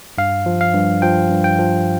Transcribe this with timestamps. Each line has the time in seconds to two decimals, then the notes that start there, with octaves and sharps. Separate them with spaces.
0.18 G2 F5
0.46 F3
0.61 F5
0.74 G2
1.02 F3 G5
1.30 G2
1.44 G5
1.59 F3